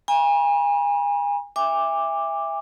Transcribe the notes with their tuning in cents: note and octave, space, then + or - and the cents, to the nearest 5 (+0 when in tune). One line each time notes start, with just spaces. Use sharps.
G#5 -35 B5 -45
E5 +0 G#5 -45 D6 +0